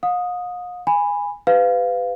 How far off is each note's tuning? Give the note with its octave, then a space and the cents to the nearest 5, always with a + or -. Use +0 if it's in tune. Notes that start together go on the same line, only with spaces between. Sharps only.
F5 +45 D#6 +0
G#5 -15 B5 +5
G4 +15 B4 +30 F5 +0